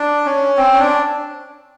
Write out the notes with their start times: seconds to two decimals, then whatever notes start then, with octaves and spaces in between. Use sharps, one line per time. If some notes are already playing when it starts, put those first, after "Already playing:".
Already playing: D4
0.26 C#4
0.57 C4
0.73 C#4
0.79 D4